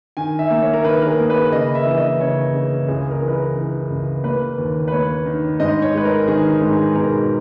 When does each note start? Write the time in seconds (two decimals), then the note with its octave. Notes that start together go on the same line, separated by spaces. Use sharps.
0.17 D#3 G#5
0.39 E5
0.51 A#3
0.62 C#5
0.74 A#4
0.84 D#3 B4
1.02 A#4
1.07 G#4
1.19 A#3
1.30 B4
1.52 C#3 D#5
1.75 E5
1.86 E3
1.97 D#5
2.20 C#3 C#5
2.54 C#3
2.88 C#2 G#4
3.11 A#4
3.22 E3
3.28 B4
3.33 A#4
3.56 E3
3.90 C#2
4.24 A#3 B4
4.58 D#2
4.88 B4
4.92 A#3 C#5
5.26 D#3
5.60 G#2 D#5
5.82 C#5
5.94 G#3 B4
6.05 A#4
6.28 D#3 G#4
6.62 G#2
6.73 G#4
6.96 B2 A#4